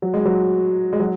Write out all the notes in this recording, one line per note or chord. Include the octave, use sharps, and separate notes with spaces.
F#3
G#3
F#3
G#3
F#3